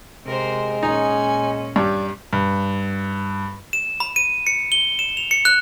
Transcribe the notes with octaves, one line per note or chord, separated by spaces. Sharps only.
C3 G#3 A#4 C5
A#2 C#4 D#4 G#5
G2 G3 D5
G2
E7
B5
D#7
C#7
G7
E7
F7
C#7
F#6